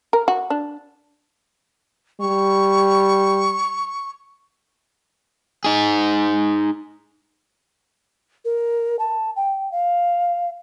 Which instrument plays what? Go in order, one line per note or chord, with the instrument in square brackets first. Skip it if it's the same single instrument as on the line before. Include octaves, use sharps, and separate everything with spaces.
[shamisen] A#4
F#4
D4
[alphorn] G3 [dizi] C#6
[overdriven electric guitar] D#4 G#4
[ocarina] A#4
A5
G5
F5